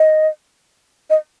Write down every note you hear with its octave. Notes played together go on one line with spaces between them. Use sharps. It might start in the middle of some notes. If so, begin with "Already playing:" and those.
Already playing: D#5
D#5